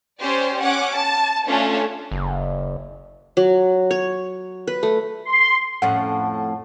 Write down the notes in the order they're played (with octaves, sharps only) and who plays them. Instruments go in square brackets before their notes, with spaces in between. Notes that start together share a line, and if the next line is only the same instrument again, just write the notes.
[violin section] C#4 G4 C5 D5
C#4 F#5 D6
A5
A3 C#4 D4 F4
[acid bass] F#1
[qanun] F#3
C#5
B4
A3
[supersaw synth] C6
[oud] F2 A2 C#4 [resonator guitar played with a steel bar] F#5